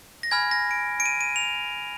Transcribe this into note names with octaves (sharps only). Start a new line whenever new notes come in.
A#6
G#5 B5 F6 G#6
A#6
D7
D7
D#7
D#7
F7